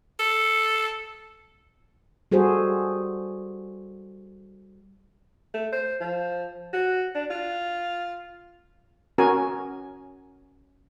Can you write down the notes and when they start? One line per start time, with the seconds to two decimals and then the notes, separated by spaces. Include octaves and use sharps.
0.20 A4
2.31 G3 F#4 G#4 A4 C5
5.54 A3
5.73 C5
6.01 F3
6.73 F#4
7.15 D4
7.31 F4
9.18 C#4 F#4 A#4 G#5